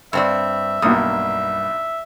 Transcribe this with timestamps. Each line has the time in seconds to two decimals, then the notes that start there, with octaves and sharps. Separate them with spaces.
0.13 G2 C4 D5 E5
0.82 B1 G2 A#3 D#6